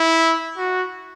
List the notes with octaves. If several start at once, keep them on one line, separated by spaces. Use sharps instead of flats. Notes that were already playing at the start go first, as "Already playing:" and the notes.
Already playing: E4
F#4